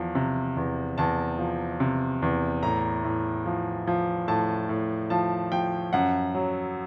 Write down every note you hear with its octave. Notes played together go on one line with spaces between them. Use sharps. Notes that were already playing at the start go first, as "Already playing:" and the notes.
Already playing: E2 F3
C3
E2
E2 A5
F3
C3
E2
A2 A#5
A2
F3
F3
A2 A5
A2
F3 A5
F3 G5
F#2 F#5
F#3